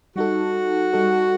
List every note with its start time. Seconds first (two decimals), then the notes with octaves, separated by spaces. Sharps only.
0.16 G3 D#4 F#4 A4
0.93 G3 D#4 A4